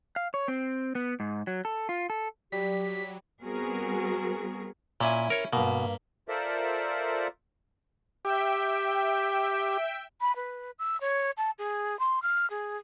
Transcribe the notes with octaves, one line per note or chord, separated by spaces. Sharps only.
F5
C#5
C4
B3
G#2
F#3
A4
F4
A4
F#3 G3 G4 B6
G3 B3 C4 F#4 G#4 A#4
A#2 C#4 E4 G#5
A#4 C#5
G2 B2 A#3
F4 A4 A#4 C5 D5 E5
G4 E5 G5
B5
B4
E6
C#5
A5
G#4
C6
F6
G#4